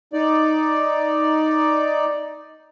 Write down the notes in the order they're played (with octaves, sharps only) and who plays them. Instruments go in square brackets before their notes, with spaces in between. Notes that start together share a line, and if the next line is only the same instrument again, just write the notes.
[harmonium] D#4 D5